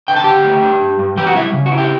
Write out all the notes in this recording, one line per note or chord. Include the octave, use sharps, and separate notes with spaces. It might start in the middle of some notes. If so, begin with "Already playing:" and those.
D3 G5
A5
D3 G4 G5
A3
D4
G2
G2
E3 G4 G5
F#4 F#5
G3 E4 E5
C#3
F#4
E4
G4